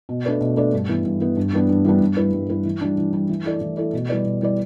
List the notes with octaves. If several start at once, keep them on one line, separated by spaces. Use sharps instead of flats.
B2
A3 D4 B4 D5
B2
A3 D4 B4 D5
G2
E3 B3
G2
E3 B3
G2
E3 G3 B3 D4
G2
E3 G3 B3 D4
G2
G3 E4 B4
G2
G3 E4 B4
E3
G3 D4
E3
G3 D4
E3
A3 E4 A4 D5
E3
A3 E4 A4 D5
B2
G3 E4 B4 D5
B2
G3 E4 B4 D5